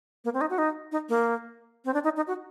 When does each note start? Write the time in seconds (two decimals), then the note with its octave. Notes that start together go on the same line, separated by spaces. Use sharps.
0.25 A#3
0.34 C4
0.41 D#4
0.50 F#4
0.58 D#4
0.92 D#4
1.09 A#3
1.85 C4
1.94 D4
2.04 D#4
2.16 D#4
2.27 F#4